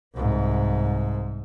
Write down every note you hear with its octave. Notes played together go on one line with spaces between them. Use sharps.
C2 G#2